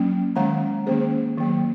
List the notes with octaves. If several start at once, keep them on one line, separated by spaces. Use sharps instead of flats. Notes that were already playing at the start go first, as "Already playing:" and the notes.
Already playing: F#3 A#3 C#4
D#3 G#3 C#4 F#5 A#5
D#3 A#3 C#4 G#4 C5
D#3 F#3 A#3